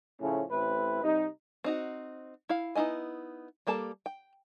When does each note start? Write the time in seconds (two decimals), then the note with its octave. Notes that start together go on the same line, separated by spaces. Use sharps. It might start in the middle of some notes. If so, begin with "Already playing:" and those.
0.21 A2 C#3 F3 A3 C#4
0.51 A1 A2 C4 E4 B4
1.04 C3 G3 D#4
1.64 C4 D#4 F#4
2.49 E4 F5
2.75 B3 D#4 E4 D#5 G#5
3.67 G3 A#3 A4 A5
4.06 G5